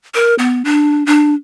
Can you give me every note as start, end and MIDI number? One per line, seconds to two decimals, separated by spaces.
0.15 0.35 70
0.38 0.62 59
0.65 1.06 62
1.06 1.34 62